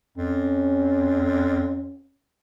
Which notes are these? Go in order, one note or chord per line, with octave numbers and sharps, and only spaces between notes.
F2 C#4